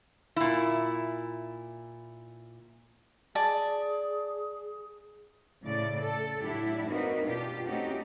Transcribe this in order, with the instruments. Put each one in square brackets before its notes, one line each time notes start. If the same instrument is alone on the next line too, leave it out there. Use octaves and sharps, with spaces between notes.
[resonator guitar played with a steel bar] A#2 E4
[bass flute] G#4 [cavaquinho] D5 G#5 A5
[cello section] A2 C#3 D5
A4
A2 F#3 D4 E4 G4
A#3 C4 D#4 F#4 A#4 B4
B2 D4 F4 G4
A3 C4 C#4 D#4 F#4 G4